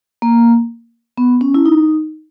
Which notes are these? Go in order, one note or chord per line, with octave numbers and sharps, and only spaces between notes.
A#3
B3
C#4
E4
D#4